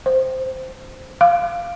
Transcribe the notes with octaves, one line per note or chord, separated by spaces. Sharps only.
C5
F5